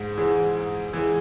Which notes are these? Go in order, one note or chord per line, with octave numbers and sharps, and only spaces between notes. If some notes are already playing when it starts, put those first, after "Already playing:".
Already playing: G#2
E3 G#3
G#2
E3 G#3